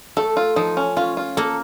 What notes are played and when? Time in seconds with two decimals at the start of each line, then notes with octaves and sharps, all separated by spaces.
0.17 A3 A4
0.37 F4
0.56 F3 D#4
0.77 C#4
0.97 C#4 F4
1.17 F4
1.37 A#3 A4